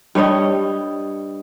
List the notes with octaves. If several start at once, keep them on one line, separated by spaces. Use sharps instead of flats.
G2 G3 C#5 D#5